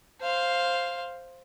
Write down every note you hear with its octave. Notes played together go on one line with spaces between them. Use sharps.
C5 F5